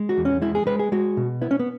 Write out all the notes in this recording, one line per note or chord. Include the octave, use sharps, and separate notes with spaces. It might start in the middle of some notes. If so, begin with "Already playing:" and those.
Already playing: G#3
F#4
E2
C#4
G#3 E4
G#4
G#3 B4
G#4
G#3 F#4
B2
B3 E4
C#4
B3